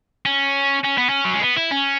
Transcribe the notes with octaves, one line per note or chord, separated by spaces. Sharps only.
C#4
C#4
B3
C#4
F#3
G#3
B3
E4
C#4